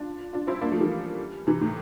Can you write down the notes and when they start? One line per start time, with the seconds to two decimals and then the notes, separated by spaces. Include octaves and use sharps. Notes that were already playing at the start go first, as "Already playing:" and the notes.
Already playing: D4 F4
0.33 D4 F4
0.47 C4 E4
0.61 A#3 D4
0.71 F3 A3
0.80 E3 G3
1.47 C3 E3
1.61 A2